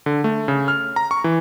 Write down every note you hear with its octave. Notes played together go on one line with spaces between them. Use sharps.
D3
A3
C#3
F6
A#5
C#6
E3